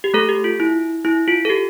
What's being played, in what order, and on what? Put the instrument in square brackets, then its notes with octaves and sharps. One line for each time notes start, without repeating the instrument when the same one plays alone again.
[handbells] G4
A3 A4
G4
F4
E4
E4
F4
A4
G4